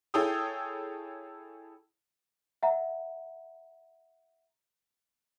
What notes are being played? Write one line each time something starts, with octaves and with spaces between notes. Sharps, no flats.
E4 G#4 A4 C#5 G5 D#6
E5 F#5 A#5